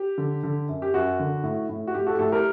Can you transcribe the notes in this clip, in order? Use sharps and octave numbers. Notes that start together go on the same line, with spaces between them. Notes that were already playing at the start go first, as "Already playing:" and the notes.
Already playing: G4
D3
D3
F#2
G4
F#2 F#4
D3
A2
A2
F#4
A2 G4
F#4 A4
G4
A2 F#4 A4
G4 A#4